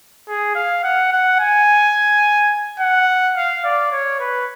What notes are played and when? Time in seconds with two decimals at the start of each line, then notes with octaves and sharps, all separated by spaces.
0.28 G#4
0.55 F5
0.84 F#5
1.12 F#5
1.39 G#5
2.80 F#5
3.36 F5
3.64 D5
3.92 C#5
4.20 B4